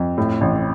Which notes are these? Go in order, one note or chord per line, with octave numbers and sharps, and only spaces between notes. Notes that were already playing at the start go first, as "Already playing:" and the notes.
Already playing: F2
A2
A1